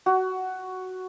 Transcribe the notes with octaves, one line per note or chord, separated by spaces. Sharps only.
F#4